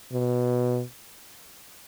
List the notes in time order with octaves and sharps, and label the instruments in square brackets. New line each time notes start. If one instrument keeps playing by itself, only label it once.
[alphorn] B2